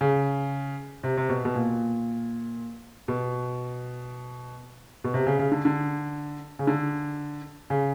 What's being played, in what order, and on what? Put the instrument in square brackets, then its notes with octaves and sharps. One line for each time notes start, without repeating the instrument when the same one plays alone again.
[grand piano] C#3
C3
C3
B2
B2
A#2
B2
B2
C3
C#3
C#3
D3
D3
C#3
D3
C#3